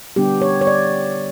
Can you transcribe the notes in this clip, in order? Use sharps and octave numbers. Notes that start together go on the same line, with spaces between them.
D3 G3 B3 D4 G4
C#5
C#5
D5